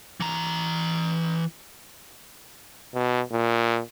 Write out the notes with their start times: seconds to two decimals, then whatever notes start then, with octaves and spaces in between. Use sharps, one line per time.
0.20 E3 A#5
2.94 B2
3.32 A#2